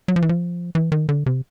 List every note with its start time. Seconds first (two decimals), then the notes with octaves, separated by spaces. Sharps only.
0.08 F#3
0.16 F3
0.22 E3
0.29 F3
0.75 E3
0.92 D#3
1.09 D3
1.26 C3